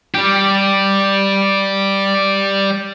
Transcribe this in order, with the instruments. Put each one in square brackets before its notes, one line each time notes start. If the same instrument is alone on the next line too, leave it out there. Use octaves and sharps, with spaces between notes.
[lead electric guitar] G3 G4